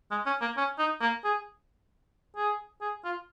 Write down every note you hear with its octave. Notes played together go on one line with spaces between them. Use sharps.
G#3
C#4
A#3
C#4
D#4
A#3
G#4
G#4
G#4
F4